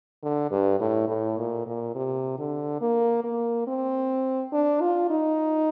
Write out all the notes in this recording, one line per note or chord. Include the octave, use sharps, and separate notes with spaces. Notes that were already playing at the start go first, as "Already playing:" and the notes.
D3
G2
A2
A2
A#2
A#2
C3
D3
A#3
A#3
C4
D4
F4
D#4